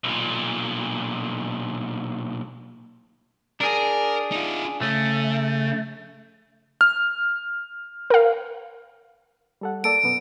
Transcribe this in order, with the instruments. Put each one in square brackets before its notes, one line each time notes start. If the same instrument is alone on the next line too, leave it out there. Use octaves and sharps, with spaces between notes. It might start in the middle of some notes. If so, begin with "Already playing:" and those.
[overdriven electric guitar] B1 A#2
[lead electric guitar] D4 G#4 [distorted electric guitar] A#4
[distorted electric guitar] D#4 F4
[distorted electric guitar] C#3 C#5 [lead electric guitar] A3
[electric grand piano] F6
[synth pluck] A#4 F5
[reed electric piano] G3 A4 F#5
[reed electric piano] A#3 A4 D5 [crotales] D7
[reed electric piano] F#2 B2 B3